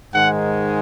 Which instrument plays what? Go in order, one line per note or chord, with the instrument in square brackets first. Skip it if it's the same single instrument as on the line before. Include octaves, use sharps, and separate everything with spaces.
[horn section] G#2 D#3 G#3 F#5